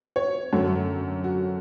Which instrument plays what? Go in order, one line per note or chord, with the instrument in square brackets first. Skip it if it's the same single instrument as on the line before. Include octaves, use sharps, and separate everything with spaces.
[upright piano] C#5
F#2 D3 F#3 A3
F#4